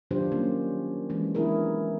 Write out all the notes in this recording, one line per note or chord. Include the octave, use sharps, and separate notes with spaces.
D#3 F#3 D4 F4 G4 C5
G3 A#3 C#4
E3 G#3 C#4
G#3 B3 D4 E4 G#4 A#4